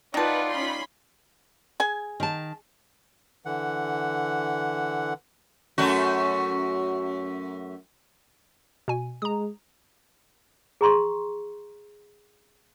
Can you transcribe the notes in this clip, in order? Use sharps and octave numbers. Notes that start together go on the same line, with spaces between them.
D#3 D#4 F4 B4 D5 F#5 A5
C#4 B5 C6
G#4 G#5
D#3 A5
D3 E3 F#5
F#2 A3 F#4
B2 G#5
G#3 A#5 D#6
G#4 A#5 C6 C#6